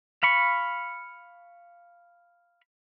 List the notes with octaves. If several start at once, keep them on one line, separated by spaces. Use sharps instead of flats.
F5 B5 C#6